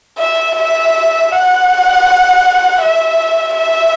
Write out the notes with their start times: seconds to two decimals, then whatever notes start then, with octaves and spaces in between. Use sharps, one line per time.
0.19 E5
0.57 E5
1.32 F#5
2.82 E5
3.57 E5